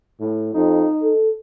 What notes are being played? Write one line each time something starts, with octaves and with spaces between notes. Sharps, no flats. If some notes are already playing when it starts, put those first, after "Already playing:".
A2
F2 D#4
A4